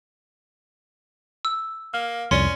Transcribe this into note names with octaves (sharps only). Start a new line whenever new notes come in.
E6
A#3 F6
C2 F2 C#4 D5 C6